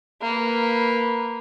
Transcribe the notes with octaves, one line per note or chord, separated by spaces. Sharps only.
A#3 B4